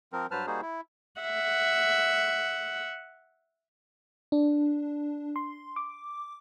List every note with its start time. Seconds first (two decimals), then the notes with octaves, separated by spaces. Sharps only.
0.13 F3 C4 A#4
0.31 G2 F#3 B4 C5 A5 F6
0.47 G3 A#3 D#4 F#4 G#4 C5
0.62 E4
1.21 E5 F#5
4.32 D4
5.36 C6
5.76 D6